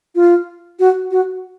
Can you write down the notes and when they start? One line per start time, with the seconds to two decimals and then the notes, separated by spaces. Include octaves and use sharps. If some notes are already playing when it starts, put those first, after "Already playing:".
0.15 F4
0.80 F#4
1.11 F#4